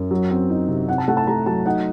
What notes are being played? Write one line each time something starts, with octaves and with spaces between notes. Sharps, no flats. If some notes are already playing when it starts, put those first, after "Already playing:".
Already playing: F#2
F#3
C4
D#4
C3
C3 F#5
A5
A3 F#5
A5
A3 A#5
F#3 A5
D#4 F#5